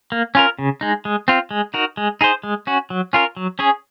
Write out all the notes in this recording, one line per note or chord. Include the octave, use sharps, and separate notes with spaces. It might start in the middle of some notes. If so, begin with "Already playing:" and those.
A#3
C#4 F4 A#4
C#3
G#3 D#4
G#3
C4 F4
G#3
D#4 F#4 A#4
G#3
D#4 G#4 C5
G#3
C#4 F#4
F#3
C#4 F4 A#4
F#3
C#4 G#4 C#5